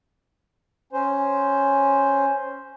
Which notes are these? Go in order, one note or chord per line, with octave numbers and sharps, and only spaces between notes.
C#4 C5